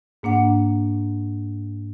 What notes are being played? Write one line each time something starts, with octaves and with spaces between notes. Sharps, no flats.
G#2 A#3 D4 F#5